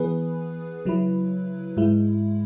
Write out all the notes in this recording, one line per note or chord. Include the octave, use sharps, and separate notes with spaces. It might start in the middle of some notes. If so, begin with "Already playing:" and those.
Already playing: E3 B3 G#4 B4
C#3 F#3 E4 B4
G#2 G#3 E4